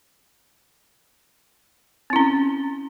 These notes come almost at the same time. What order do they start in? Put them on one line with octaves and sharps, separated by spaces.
C4 E4 C#4